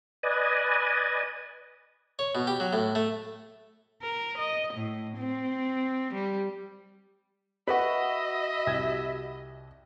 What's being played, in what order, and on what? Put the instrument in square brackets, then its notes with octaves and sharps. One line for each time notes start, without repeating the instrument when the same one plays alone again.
[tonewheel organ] B4 D5 D#5 G#5
[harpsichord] C#5
B2
G4
F#3
A2
A3
[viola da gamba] A#4
D#5
A2
C4
G3
[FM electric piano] F#4 B5 [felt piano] B4 [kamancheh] D#5 [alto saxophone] E5
[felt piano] C2 G4 G#6